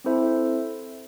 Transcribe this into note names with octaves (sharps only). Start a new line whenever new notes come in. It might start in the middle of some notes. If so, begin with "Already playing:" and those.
C4 E4 A4 C5 E5